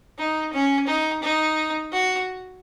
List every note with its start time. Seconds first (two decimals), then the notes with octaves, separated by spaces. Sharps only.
0.19 D#4
0.53 C#4
0.87 D#4
1.23 D#4
1.92 F#4